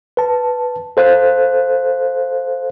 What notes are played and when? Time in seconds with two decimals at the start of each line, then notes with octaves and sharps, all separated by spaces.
0.17 B4 A5
0.97 A4 C5 F5 F#6